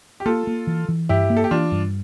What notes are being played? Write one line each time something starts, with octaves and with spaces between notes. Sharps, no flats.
G4
A#3 F4 A4
A#3
E3
E3
G2 E4 G4
A#3
A4
G4
E3 D4 F4
G2